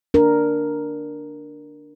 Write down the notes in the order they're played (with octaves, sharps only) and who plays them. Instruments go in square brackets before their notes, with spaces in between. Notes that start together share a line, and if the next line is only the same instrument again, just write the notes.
[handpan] D4 A#4